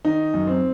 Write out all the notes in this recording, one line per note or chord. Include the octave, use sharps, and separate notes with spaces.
D#3 D#4
F#2
C4